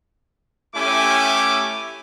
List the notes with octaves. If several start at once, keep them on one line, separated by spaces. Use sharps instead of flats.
A3 C#4 E4 G4 G#5 D6